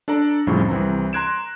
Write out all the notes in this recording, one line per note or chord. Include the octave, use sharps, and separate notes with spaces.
D4 A4 D5 A#5
C2 F2 A2 C#3 F3
C2 E3 C4 A#5
A#5 C6 F#6 G#6 D7 E7